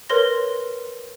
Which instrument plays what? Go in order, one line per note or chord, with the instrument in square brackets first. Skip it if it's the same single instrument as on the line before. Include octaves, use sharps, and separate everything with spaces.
[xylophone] A#4 B4 C#5 C6 A#6